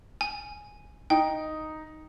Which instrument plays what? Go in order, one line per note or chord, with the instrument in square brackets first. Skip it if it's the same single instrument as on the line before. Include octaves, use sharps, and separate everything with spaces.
[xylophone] G#5
[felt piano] D#4 [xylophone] G5